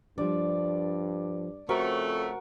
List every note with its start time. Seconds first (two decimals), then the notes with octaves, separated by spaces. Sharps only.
0.18 G2 F3 G3 D4 D5
1.69 F2 C#3 A3 F#4 A#4 C5 C#6